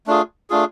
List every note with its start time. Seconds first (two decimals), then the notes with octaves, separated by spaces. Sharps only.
0.07 A3 D4 F4 G#4
0.50 A3 D4 F4 G#4